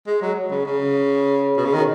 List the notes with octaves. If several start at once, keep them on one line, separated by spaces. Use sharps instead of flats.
G#3
F#3
C#3
C#3
B2
C#3
D#3